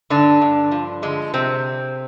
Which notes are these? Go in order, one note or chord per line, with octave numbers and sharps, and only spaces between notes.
G2 D3 D4
G2
F3
D3 G#3
C3 C4